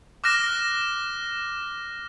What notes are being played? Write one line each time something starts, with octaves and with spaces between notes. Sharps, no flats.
D6 F6 F#6 A#6 E7